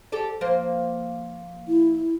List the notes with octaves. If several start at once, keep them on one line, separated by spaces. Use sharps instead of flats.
G4 A4 D5
F3 A#3 C5
E4